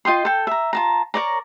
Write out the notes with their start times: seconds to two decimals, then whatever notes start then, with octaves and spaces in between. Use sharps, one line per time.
0.05 F4 D#5 G5 C6
0.25 A4 G5
0.47 E5 A#5
0.73 F4 A5 A#5
1.14 A#4 C#5 D5 A#5